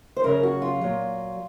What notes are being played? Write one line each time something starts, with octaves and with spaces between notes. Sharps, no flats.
C5
F#2 C#3 F#3 A#4
F#4
F4
A#2 F#3